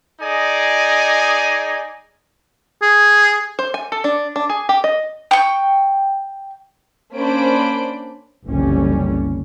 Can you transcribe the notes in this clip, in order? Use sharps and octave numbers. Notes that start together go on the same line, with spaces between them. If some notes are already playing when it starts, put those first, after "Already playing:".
D#4 G#4 D5 D#5 G#5
G#4
C5
G#5
A4
D4
D4
G#4
G4
D#5
G5 C#6
A#3 C#4 D4 C5 B5 D7
F#1 C2 D3 E3 G3 C#4